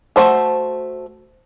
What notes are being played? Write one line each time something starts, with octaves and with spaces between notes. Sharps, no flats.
A3 F#4 C5 A5